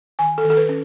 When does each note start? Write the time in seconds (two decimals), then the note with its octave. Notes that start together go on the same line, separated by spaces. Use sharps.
0.19 D#3 G#5
0.38 A4
0.45 D#3
0.50 A4
0.57 B4
0.69 C#4